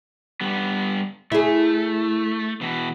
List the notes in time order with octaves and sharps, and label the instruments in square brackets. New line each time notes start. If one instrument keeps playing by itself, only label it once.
[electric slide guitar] G2 G3 B3
[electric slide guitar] A3 [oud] E4 G#4
[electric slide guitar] B2 E3